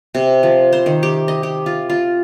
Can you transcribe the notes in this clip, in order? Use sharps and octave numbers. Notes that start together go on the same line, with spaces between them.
C3
F3
C5
D#3
G4
D#5
G4
F4
F4